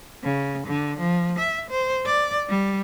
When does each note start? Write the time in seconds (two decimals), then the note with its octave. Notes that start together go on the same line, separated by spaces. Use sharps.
0.24 C#3
0.67 D3
1.00 F3
1.39 E5
1.71 C5
2.06 D5
2.50 G3